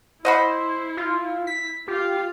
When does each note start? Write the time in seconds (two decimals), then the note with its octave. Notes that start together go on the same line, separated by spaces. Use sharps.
0.25 E4 C5 D#5 F#5 B5
0.97 F4
1.47 B6
1.88 F4 G4 F5